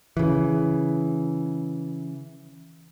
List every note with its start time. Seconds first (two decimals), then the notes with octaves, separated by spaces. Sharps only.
0.17 C#3 E3